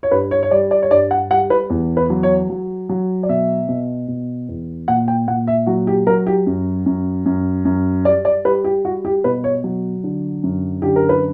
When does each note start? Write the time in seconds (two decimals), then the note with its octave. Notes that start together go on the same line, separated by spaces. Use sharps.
0.03 C#5
0.11 G2 B4
0.31 C#5
0.43 C#5
0.51 G3 D5
0.71 D5
0.82 C#5
0.91 G2 D5
1.11 F#5
1.30 G3 F#5
1.50 B4
1.70 E2
1.97 B4
2.10 F#3
2.23 C#5
2.50 F#3
2.89 F#3
3.23 D5
3.29 B2 E5
3.69 B2
4.08 B2
4.49 E2
4.88 A#2 F#5
5.08 G5
5.28 A#2 F#5
5.47 E5
5.67 F#3 F#4
5.87 G4
6.07 F#3 A#4
6.27 G4
6.47 F#2
6.86 F#2
7.26 F#2
7.65 F#2
8.05 G3 D5
8.25 D5
8.45 G3 B4
8.64 G4
8.85 G3 F#4
9.05 G4
9.24 B2 B4
9.44 C#5
9.64 F#3
10.04 D3
10.43 F#2
10.82 D3 G4
10.96 A#4
11.09 B4